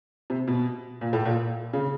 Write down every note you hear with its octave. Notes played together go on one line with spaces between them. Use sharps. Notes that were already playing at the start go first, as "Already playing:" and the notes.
C3
B2
A#2
A2
A#2
C#3